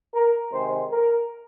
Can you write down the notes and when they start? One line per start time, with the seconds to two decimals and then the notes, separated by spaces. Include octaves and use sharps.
0.14 A#4
0.51 C3 D#3 G#3 C5
0.90 A#4